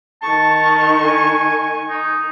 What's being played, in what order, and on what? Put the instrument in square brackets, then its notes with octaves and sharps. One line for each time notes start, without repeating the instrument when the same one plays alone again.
[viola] D#3 C#6 [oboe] A5
[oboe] G#5
D#4